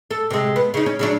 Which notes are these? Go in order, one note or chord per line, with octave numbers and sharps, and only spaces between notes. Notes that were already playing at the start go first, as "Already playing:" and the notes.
A4
C3 G#3
B3
C#3 D#4
C#4
C#3 F#3 D4